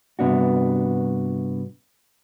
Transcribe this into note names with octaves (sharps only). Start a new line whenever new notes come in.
G2 C3 B3 D4 F#4